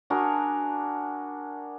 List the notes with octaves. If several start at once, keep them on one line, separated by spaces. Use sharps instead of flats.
D4 F#4 G#4 A#4